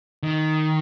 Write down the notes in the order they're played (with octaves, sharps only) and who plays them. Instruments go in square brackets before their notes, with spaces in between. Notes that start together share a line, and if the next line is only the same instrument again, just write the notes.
[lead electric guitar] D#3